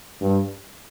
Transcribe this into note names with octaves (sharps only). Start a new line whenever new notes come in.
G2